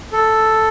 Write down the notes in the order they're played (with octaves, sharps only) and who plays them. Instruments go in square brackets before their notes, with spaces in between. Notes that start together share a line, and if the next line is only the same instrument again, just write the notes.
[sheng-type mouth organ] A4